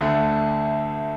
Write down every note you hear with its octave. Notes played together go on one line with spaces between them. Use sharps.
D2 D3 A3